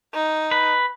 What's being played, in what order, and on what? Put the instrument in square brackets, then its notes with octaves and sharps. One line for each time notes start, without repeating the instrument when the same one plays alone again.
[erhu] D#4
[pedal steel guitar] B4